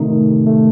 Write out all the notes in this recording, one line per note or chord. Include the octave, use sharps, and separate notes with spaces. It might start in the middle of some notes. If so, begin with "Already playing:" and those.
Already playing: C3 D#3 A3 D#4
D#3
C3
A3